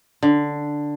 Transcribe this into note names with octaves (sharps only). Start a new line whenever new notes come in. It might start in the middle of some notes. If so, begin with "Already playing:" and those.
D3